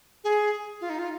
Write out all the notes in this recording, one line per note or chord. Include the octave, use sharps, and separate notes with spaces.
G#4
F4
D#4
F4